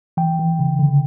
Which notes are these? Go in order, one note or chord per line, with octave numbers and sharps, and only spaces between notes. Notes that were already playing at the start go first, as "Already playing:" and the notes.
E3 G5
E3
C#3
D3